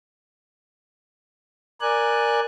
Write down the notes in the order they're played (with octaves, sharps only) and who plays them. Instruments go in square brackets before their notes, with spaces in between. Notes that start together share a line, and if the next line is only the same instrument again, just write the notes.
[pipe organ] A#4 D5 G#5 F#6